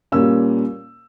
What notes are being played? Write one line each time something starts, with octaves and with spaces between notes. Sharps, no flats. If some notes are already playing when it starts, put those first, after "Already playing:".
A#2 G3 A#3 C#4 E6